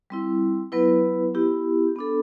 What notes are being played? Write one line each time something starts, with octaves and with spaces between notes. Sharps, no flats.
G3 C4 E4
F#3 B3 E4 B4
B3 E4 G4
B3 D4 A4